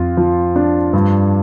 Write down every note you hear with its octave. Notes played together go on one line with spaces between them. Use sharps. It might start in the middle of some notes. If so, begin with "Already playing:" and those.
Already playing: F2 F4
F3
D4
G2